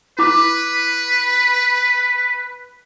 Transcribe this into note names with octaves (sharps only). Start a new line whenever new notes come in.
E4 B4 D6